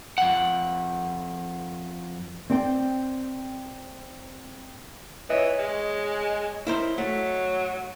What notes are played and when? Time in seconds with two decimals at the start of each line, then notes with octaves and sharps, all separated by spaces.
0.18 F2 F#5
2.50 C4 D5 G5
5.30 E3 C#5 D#5
5.59 G#3
6.67 E4 A#4 C5
6.98 F#3 A3